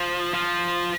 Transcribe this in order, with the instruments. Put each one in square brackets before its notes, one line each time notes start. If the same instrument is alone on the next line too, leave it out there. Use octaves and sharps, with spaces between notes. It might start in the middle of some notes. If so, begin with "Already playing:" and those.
Already playing: [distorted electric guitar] F3
F3